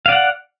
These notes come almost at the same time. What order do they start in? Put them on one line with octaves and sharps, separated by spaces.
F5 D5 F#5